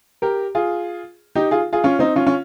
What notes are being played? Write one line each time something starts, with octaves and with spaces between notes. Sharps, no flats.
G4 A#4
F4 G#4
D#4 G4
F4 G#4
F4 G#4
C#4 F4
C4 D#4
C#4 F4
C#4 F4